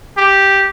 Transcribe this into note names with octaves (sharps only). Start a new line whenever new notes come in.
G4